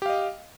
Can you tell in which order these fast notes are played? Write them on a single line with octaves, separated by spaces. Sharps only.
G4 F5 D#5